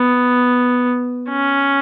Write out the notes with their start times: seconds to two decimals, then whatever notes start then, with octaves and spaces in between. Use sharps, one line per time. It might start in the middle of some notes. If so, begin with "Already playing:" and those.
Already playing: B3
1.30 C#4